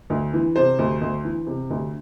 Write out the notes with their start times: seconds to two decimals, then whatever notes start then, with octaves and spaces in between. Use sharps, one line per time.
0.10 D2
0.33 E3
0.56 C3 C5
0.79 D2
1.01 D2
1.24 E3
1.47 C3
1.70 D2